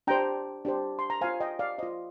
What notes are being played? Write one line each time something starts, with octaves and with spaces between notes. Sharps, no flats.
D4 G4 C5 G5 A#5
D4 G4 C5
C6
A#5
F4 C5 F5 G#5
D#5 G5
D5 F5
F4 C5 D#5